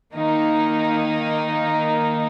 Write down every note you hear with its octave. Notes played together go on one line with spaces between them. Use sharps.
D#3 A#3 D#4